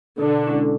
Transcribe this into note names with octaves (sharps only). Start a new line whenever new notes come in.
B2 D3
G#3 C#4 E4